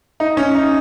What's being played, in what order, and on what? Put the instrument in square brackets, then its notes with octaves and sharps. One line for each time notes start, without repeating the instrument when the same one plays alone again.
[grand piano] D#4
C#4
D#4